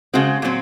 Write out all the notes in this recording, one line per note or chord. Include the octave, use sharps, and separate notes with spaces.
C#3 G#3 C4 F#4
A#2 F#3 C4